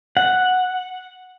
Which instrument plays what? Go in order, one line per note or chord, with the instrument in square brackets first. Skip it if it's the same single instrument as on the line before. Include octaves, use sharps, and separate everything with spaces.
[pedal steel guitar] F#5